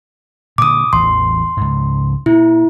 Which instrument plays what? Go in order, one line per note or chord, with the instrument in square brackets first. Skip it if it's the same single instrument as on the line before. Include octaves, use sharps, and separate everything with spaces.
[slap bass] A#2 D3 [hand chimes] D6 D#6
[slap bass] A1 E2 [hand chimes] C6
[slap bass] C#2 G#2
[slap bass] A#2 [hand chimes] E4